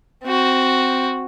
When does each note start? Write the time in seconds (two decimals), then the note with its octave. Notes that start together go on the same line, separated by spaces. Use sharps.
0.24 C4 F#4